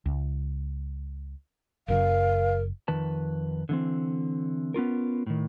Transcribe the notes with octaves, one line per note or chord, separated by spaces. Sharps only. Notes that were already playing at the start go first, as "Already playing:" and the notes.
C#2
F#1 F#2 C#3 A#4 F5
F2 D#3 B4 A5
D3 E3 C4
B3 C#4 F4 A#4
A2 D#3